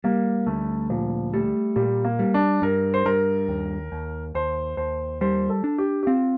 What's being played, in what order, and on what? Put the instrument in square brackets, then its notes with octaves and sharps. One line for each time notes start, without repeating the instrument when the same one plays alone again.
[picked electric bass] G3 [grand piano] A#3
[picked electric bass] D2 [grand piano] A3
[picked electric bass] A#2 [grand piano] F3
[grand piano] G3 [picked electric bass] A3
[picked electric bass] A#2 [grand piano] G3
[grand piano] A#3
[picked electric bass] G3
[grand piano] D4
[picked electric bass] G2 [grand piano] A#4
[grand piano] C5
[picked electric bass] G2 [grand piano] A#4
[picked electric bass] D#2
D#2
[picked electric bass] D#2 [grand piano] C5
[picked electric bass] D#2 [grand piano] C5
[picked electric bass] G3 [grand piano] C5
[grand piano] A4
[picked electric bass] D4
[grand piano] G4
G4
[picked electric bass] C4 [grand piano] F4